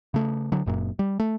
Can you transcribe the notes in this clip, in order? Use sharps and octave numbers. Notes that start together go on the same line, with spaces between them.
C#3 A3
D3 F#3
F#1 F#2 A#2
G3
A3